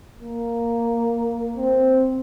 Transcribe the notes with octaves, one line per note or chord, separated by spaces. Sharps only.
A#3
C4